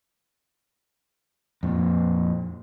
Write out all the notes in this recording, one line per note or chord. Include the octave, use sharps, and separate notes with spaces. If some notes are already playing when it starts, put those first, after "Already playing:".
F2 A#2